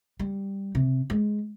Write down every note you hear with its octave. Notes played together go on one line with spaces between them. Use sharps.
G3
C3
G#3